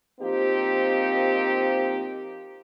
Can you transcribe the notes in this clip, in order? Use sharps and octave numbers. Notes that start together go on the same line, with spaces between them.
F3 A#3 C4 D#4 G4